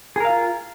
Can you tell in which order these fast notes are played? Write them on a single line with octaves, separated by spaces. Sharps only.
G#4 A#4 F5 F4